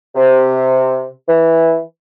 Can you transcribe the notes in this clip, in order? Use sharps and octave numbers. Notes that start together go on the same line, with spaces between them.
C3
E3